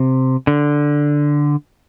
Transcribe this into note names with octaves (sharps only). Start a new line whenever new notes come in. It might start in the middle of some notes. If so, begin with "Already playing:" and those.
Already playing: C3
D3